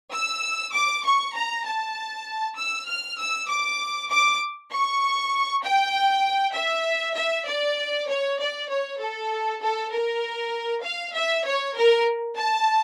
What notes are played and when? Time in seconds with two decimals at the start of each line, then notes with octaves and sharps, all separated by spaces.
0.12 E6
0.73 D6
1.04 C#6
1.35 A#5
1.66 A5
2.57 E6
2.87 F6
3.18 E6
3.49 D6
4.10 D6
4.72 C#6
5.63 G5
6.54 E5
7.16 E5
7.47 D5
8.08 C#5
8.39 D5
8.69 C#5
9.00 A4
9.61 A4
9.92 A#4
10.83 F5
11.15 E5
11.45 C#5
11.75 A#4
12.36 A5